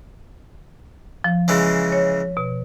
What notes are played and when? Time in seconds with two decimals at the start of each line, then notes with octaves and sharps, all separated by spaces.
1.24 F3
1.48 C#3 E3 G#3
1.92 C#5
2.37 B2